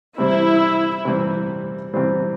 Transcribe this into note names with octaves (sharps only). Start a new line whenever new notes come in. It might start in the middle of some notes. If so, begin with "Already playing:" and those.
C3 E3 G3 C4 E4
C3 E3 G3 C4
C3 E3 G3 C4